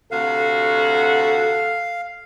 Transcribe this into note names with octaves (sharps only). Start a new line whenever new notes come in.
D2 C3 F#4 A4 F5